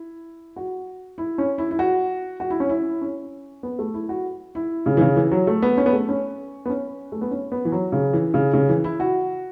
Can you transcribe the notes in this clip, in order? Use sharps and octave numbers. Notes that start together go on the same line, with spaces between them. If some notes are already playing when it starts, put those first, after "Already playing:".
Already playing: E4
F#4
E4
C#4
E4
E4
F#4
F#4
E4
C#4
E4
C#4
B3
A3
E4
F#4
E4
C#3
E3
C#3
E3
F#3
A3
B3
C#4
B3
A3
C#4
B3
C#4
A3
B3
C#4
B3
E3
F#3
C#3
E3
C#3
C#3
E3
E4
F#4